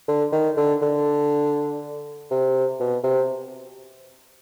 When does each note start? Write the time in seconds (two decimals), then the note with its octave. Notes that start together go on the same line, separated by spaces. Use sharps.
0.08 D3
0.33 D#3
0.57 D3
0.82 D3
2.31 C3
2.80 B2
3.04 C3